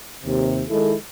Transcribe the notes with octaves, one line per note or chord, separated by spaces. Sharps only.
D#2 C3
D#3 G#3 E4 A4